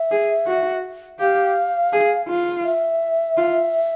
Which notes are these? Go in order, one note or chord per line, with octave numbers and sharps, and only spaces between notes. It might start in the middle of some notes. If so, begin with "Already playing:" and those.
Already playing: E5
G#4
F#4
G4 F5
G#4
F4
E5
F4